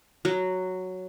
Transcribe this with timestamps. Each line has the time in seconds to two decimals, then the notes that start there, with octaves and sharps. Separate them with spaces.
0.25 F#3